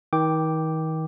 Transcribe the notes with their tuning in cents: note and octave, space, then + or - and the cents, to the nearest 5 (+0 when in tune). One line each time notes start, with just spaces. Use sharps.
D#3 +35 G5 +0 D6 +0